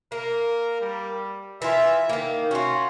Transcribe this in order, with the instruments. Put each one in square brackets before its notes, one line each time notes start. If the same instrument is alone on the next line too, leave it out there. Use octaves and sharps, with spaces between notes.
[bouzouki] A#3 [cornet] A#4
[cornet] G3
[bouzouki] E3 F4 [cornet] E5
[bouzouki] D#3 A#3
[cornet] C#4 [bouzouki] F4 F#4